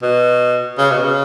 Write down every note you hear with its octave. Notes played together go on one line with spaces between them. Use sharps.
B2
C#3
B2
C#3